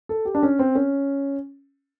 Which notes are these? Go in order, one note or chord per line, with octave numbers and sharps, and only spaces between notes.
A4
G4
D4
C#4
C4
C#4